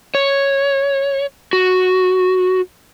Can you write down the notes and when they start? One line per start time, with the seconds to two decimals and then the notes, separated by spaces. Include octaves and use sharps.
0.15 C#5
1.53 F#4